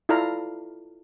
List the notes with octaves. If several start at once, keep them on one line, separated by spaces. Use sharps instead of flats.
E4 F4 A4 D5 F5 A#5